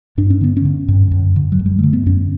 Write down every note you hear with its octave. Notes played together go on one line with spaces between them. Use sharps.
G2 D4
C#4
D3 B3
C#4
D3
G2
F#2
D3
F#3
F#2
G3
D3 A3
B3
F#2 C#4